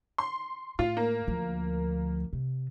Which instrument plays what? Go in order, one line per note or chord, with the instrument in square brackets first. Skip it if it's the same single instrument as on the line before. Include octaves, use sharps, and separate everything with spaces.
[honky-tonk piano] C6
[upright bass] A2 [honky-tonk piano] F4
[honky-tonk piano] A#3
[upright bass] D2 F3
C3